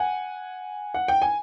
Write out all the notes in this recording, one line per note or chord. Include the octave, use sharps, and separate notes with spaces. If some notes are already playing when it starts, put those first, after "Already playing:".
Already playing: F#5 G#5
F#5
G5
G#5